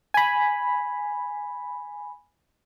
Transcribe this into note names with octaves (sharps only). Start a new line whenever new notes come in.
G#5 B5